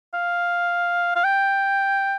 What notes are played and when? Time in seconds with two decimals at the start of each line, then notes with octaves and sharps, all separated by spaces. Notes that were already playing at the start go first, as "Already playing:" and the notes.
0.14 F5
1.15 F5
1.24 G5